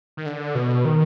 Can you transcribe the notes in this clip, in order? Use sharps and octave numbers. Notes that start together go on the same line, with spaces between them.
D#3
D3
B2
D#3